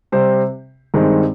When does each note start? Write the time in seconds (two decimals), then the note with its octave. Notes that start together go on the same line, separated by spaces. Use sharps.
0.12 C3 G3 C4 G4 C5
0.94 G2 D#3 G#3 C4 D#4